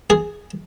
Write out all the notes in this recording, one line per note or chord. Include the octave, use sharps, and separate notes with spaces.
G#4